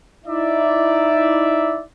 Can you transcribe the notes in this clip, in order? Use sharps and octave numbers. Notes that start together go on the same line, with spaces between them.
D#4 E4 D5 E5